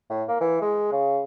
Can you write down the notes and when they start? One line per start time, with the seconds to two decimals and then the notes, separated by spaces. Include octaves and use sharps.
0.10 A2
0.28 A#3
0.41 E3
0.62 G#3
0.92 C#3